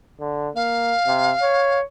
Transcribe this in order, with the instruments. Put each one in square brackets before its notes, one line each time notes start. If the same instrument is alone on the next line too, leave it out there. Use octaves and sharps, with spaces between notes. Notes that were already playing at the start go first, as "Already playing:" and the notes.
[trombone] D3
[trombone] A#3 [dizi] F5
[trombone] C3
C#5